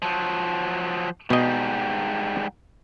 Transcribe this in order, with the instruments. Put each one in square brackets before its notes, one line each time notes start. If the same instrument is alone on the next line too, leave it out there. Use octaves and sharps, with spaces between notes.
[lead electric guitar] F3 F#3
[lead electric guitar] G#2 G3 [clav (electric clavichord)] B2 D#5